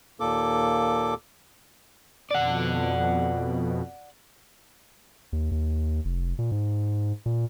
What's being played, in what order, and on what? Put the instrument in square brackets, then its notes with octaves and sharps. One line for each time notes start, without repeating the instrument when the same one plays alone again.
[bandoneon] D#2 A#2 A#3 A4 D6
[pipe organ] F2 B2 [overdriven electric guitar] D5 F#5
[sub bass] D#2
D#2
F1
A#2
G#2
A#2